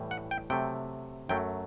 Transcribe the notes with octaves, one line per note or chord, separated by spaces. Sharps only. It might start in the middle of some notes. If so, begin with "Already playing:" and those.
Already playing: A2 E3 G3
F#5
G5
C3 F#3 A3 G5
F#2 F#3 A3 G5